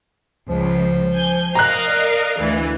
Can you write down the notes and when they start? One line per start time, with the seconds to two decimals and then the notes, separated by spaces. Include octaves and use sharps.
0.49 C#2 F3
1.15 G#5 G6
1.55 A#4 D#5 F5 A#5 F#6
1.87 D5
2.40 D2 E3